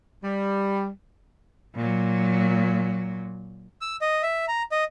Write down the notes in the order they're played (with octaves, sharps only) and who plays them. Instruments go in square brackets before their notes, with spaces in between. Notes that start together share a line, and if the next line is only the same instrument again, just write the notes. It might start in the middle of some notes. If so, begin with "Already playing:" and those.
[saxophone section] G3
[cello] A#2 F#3
[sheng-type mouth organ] E6
D#5
E5
A#5
D#5